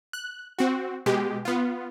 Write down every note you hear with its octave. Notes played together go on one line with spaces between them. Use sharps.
F#6
C4 F#4
B2 G#3 G4
B3 F4